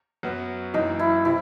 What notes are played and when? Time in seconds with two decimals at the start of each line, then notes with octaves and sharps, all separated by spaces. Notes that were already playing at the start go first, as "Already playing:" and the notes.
0.23 F#2 F#3 B3
0.74 F#1 F#2 E3 D#4
0.99 E4
1.25 C3 E4